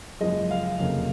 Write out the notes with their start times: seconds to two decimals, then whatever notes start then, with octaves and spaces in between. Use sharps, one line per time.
0.21 F#1 F#2 F3 G#3 D#5
0.51 F5
0.80 F1 F2 C#3 F#3 A#3